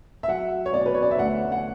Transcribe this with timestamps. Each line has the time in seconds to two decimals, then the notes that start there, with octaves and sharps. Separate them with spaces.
0.23 E5
0.28 F#3 F#5
0.66 C#5
0.73 B2 D5
0.86 B4
0.94 C#5
1.02 D5
1.11 E5
1.19 D2 F#5
1.52 F#5